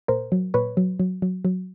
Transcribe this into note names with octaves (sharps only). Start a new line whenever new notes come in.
A#2 A#4 C5
F#3
A#2 B4 C#5
F#3
F#3
F#3
F#3